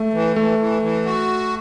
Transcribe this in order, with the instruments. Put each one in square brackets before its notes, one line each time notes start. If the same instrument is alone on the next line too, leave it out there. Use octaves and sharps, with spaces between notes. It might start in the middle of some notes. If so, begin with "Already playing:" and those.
Already playing: [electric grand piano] A3
[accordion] E3
[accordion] E3 [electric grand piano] A3
[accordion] E3
E3
F#4